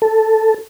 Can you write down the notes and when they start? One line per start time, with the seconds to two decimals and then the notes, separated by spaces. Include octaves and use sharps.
0.02 A4